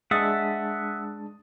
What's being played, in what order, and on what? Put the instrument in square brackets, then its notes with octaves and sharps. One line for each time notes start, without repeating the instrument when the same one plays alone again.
[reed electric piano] G#3 D4 A5 [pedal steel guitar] E5 F#5 [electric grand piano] D#6 A6